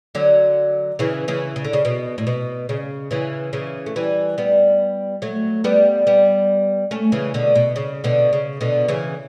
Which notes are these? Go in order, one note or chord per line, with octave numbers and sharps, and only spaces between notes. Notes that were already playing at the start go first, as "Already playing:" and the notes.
D3 F#3
C#3 E3
C#3 E3
C#3
D3
C#3
B2
A2
B2
C#3
C#3 E3
C#3 E3
A3
E3 G3
G3 B3
F#3 A3
G3 B3
G3 B3
A3 C#4
C#3 E3
B2 D3
B2
C#3
B2 D3
C#3
B2 D3
C#3 E3